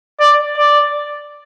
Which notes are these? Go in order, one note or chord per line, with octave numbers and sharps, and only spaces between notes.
D5
D5